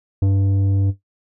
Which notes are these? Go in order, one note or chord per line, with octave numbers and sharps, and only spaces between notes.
G2